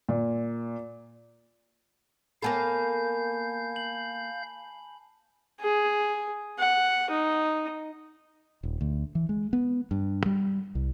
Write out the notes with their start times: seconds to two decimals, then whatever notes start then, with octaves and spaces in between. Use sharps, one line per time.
0.09 A#2
2.42 A#3 B3 A4 F5 G#5 A5 B5 G6
3.76 F#7
5.60 G#4
6.58 F#5
7.10 D#4
8.63 D#1
8.81 D2
9.15 E3
9.29 G#3
9.53 B3
9.91 G2
10.26 G3
10.75 C2